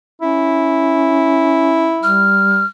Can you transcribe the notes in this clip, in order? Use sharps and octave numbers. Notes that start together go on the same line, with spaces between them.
C#4 E4
G3 F6